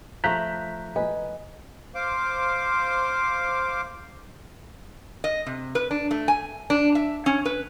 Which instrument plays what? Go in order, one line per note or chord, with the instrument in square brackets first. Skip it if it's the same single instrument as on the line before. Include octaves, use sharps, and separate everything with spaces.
[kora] F3 A3 [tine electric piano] A#5 F#6 G6 [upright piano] B6
[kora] B4 [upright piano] D#5 G#5
[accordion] C5 F5 D6
[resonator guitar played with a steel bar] D#5
C3
B4
D4
A3
G#5
D4
E5
C#4
B4